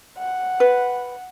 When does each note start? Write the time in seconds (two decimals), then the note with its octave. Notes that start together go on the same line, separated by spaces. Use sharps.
0.18 F#5
0.60 B4